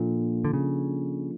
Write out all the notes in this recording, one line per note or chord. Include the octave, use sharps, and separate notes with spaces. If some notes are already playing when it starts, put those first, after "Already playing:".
Already playing: A#2 F3 A#3 D4 F4 A4
D3
C#3